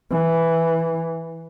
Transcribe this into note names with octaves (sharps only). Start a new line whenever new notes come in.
E3